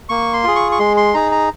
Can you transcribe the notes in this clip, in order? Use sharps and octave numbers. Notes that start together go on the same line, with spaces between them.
A#3 C#6
C6
F4 G#4
C#6
C#6
G#3 C6
C6
D#4 G#4 A#5
A#5